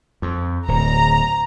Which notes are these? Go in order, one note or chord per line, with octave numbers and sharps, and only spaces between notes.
F2
D1 A#5